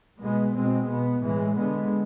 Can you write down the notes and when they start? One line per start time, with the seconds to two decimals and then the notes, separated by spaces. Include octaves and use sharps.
0.21 B2 G#3 B3
0.56 B2 G#3 C4
0.89 B2 B3
1.23 A2 E3 G#3
1.57 D3 G#3 B3